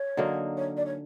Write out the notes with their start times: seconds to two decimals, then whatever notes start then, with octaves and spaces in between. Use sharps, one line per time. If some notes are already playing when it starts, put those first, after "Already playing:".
Already playing: C#5
0.17 D3 F#3 A#3 D#4
0.57 C#5
0.76 D5
0.86 C#5